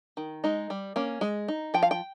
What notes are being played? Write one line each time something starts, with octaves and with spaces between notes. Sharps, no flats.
D#3
G#3 D#4
G3
A#3 C#4
G#3
D#4
F3 G5
F5
G5